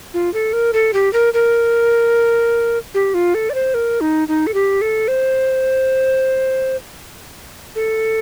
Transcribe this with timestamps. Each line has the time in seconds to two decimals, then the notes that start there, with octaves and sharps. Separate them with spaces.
0.14 F4
0.34 A4
0.53 A#4
0.73 A4
0.94 G4
1.13 A#4
1.34 A#4
2.94 G4
3.14 F4
3.35 A4
3.50 D5
3.54 C5
3.74 A#4
4.01 D#4
4.28 D#4
4.47 A4
4.54 G4
4.81 A4
5.08 C5
7.76 A4